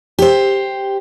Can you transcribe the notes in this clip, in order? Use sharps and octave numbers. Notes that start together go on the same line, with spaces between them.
G4 C5